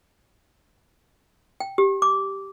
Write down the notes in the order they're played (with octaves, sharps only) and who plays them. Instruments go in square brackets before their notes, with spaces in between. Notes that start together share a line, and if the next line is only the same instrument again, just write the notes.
[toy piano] G5
G4
D6